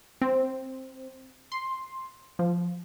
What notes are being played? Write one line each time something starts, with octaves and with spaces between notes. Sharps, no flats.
C4
C6
F3